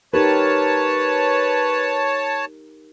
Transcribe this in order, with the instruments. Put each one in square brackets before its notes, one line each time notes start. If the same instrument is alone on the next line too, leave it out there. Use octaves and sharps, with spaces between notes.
[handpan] D#4 G4 A#4 [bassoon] B4 [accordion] C#5 A5